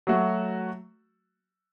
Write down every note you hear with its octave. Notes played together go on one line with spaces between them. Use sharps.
F#3 A3 F#4